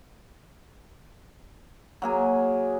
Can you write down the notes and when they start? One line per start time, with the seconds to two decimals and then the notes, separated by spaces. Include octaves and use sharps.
2.02 F#3 A#3 G#4